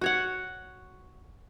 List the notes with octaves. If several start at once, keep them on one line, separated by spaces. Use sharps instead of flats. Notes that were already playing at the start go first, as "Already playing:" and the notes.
F#4 C#5 F#5